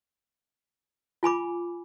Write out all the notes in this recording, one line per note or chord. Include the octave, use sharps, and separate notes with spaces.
F4 G#5 B5 D6